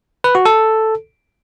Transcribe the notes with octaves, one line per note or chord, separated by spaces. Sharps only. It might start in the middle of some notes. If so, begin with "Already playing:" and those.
B4
F#4
A4